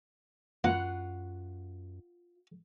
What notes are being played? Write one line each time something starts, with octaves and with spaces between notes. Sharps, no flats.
F#2 A#3 F4 F#5